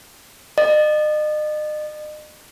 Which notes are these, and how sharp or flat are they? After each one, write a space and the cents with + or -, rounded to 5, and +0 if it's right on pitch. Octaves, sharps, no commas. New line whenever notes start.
D#5 -40